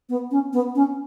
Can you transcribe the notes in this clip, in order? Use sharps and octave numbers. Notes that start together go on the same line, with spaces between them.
B3
C#4
B3
C#4